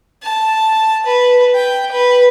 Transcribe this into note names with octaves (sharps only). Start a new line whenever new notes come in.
A5
B4
G5
B4